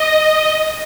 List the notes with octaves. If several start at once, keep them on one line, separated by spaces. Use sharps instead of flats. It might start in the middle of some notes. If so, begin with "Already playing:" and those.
Already playing: D#5